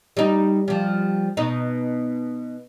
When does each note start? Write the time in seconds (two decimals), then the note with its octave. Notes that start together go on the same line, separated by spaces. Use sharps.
0.17 G3 D#4
0.68 F3 G3
1.37 B2 D#4